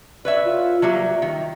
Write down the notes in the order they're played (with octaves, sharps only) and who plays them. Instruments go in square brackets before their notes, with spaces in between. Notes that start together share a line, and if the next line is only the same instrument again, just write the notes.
[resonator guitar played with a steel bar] B4 C#5 E5 [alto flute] D5
[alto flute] F4
[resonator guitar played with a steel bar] F#3 G3 A#3 [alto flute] E5
[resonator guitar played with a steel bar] D#3